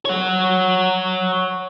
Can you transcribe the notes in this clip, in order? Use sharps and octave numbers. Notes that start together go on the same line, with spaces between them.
C#5 F#5